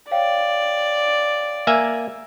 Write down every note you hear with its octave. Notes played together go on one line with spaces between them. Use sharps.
C#5 D5 F5 G5
A#3 E5 G#5